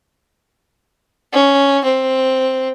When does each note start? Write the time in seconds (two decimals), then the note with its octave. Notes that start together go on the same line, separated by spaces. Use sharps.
1.33 C#4
1.84 C4